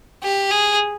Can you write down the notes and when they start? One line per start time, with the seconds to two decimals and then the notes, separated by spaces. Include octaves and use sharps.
0.23 G4
0.50 G#4